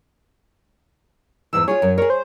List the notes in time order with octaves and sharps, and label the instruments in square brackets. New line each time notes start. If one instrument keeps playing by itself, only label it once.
[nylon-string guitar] E2 G#2 E3 [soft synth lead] E6
[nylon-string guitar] F4 G4 G#4 [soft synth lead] C#5
[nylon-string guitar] F#2
[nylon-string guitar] G#4 C#5 [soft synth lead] A#4
[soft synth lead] C5